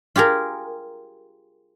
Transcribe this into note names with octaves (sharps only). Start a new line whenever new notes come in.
F4 G4 G#4 A#4